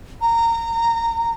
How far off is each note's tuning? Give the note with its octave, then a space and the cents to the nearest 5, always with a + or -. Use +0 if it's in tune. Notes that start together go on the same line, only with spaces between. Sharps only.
A#5 -20